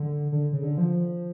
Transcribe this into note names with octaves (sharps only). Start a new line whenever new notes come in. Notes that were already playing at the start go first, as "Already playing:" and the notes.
Already playing: D3
D3
C#3
D3
F3